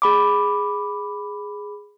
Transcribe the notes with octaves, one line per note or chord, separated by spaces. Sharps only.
G#4 B5 D6